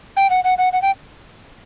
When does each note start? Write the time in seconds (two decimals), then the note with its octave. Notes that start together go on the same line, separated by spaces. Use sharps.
0.17 G5
0.30 F#5
0.44 F#5
0.58 F#5
0.73 F#5
0.82 G5